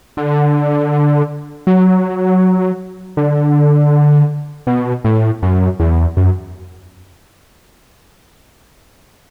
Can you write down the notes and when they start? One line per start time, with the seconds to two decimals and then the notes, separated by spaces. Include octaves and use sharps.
0.17 D3
1.67 F#3
3.17 D3
4.67 B2
5.04 A2
5.42 F#2
5.80 E2
6.17 F#2